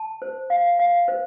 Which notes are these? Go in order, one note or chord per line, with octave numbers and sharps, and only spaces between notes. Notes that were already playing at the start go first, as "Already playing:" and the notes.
Already playing: A5
C5
F5
F5
C5